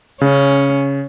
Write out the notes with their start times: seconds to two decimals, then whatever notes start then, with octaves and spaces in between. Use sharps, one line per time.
0.21 C#3 C#4